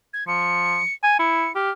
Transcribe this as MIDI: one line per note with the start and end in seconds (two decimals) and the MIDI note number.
0.13 0.26 92
0.28 0.80 53
0.28 0.93 97
1.03 1.15 80
1.19 1.49 64
1.19 1.52 97
1.55 1.71 67
1.55 1.71 89